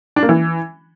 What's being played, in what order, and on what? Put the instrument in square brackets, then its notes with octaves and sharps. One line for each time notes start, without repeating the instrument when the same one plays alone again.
[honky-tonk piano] D4
A#3
E3